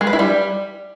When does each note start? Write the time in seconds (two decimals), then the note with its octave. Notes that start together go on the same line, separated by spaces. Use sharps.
0.01 G#3
0.07 B4
0.13 E4
0.19 G3